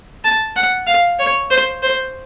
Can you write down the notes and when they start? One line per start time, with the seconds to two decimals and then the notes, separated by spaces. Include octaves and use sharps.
0.24 A5
0.56 F#5
0.87 F5
1.19 C#5
1.51 C5
1.83 C5